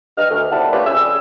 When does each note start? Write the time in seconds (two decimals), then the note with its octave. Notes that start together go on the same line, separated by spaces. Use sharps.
0.17 G2 D#5 F6
0.30 D2
0.51 D#2 C3 G3 E4 F#5 A5
0.72 A3 C#4 D4 F4 G4 B4
0.87 F2 C#3 G#4 E6